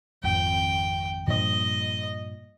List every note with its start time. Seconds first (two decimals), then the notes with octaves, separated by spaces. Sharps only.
0.23 G#1 F2 G5
1.27 G2 A#2 F3 D#5